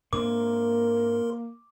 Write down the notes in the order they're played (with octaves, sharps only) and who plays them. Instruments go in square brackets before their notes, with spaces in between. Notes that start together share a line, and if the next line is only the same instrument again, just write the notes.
[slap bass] G#2 C4 D4 [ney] A#3 [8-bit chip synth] A#4 C6 [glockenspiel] D6